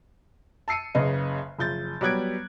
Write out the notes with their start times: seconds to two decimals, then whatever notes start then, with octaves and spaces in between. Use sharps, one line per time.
0.68 A5 E6 C7 C#7 D#7
0.95 F#1 C#3 B4 D#5
1.58 F#1 F3 G6 A6
2.01 F#3 G3 B3 F#6 G#6 D7